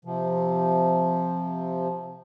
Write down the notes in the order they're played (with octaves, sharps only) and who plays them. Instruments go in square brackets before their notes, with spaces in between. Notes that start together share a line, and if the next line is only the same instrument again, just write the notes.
[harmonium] C3 F3